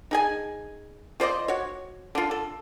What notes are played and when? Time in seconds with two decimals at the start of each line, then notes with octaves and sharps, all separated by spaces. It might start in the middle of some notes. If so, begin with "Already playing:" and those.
0.11 D#4 G#4 G#5
1.20 F4 C5 D5 D#5
1.48 F#4 C#5
2.15 D3 F4
2.31 A4